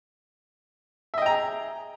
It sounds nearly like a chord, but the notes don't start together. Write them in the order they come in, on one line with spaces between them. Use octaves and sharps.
E5 D#5 G5 A#5 G#4